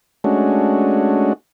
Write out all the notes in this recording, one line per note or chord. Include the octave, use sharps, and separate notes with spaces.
G#3 A3 C#4 D4 F#4